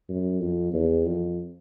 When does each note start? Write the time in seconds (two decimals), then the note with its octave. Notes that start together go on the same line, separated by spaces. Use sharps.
0.09 F#2
0.41 F2
0.74 E2
1.05 F2